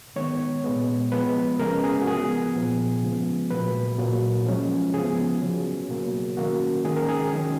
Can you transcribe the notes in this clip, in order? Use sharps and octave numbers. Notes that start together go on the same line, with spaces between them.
D#3 G#3 B3 C#5
A#2 G#3 B3
F3 G#3 B3 B4
C#3 G#3 C#4 A#4
G#4
F#4
F3 B3 G#4
A#2 F3 B3
C#3 F3 G#3 B3
A#2 F#3 A#3 B4
A#2 F#3 A#3
F3 G#3 C#4
C#3 F3 B3 G#4
C#3 F#3 C#4
B2 F#3 A#3
D#3 A#3 C#4 F#4
D#3 G#3 C#4 G#4
A#4
G#4
D#3 F#3 C#4